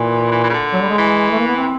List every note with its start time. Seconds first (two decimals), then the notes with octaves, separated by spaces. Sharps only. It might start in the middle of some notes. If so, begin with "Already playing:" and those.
Already playing: A#2 E3
0.31 E3
0.43 E3
0.49 C#3
0.54 D3
0.73 F#3
0.81 G3
0.90 G#3
0.98 E3
1.31 A3
1.40 A#3
1.48 B3
1.56 C4